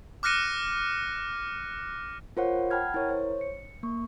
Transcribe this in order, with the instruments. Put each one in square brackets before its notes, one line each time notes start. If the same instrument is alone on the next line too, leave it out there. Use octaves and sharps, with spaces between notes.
[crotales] D6 F6 F#6 A#6 C#7 D#7
[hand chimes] F4 A#4 C5 C#5 F#5
F#5 G5 A5 B5 F6 G#6
E4 A#4 C#5
C5 C#5
C#7
A#3 C#6